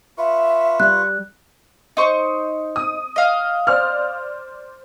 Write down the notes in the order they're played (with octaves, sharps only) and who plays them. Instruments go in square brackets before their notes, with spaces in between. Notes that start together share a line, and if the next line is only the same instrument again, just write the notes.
[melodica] F4 B4 C#6 [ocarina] E5
[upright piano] G3 [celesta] F#6
[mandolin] D#4 C5 C#6
[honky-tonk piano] D#6
[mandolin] D#5 F5
[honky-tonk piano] C5 D5 F6